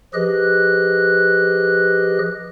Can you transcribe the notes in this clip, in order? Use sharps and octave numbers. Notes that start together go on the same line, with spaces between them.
F3 G4 G#4 B4 D#5 F#6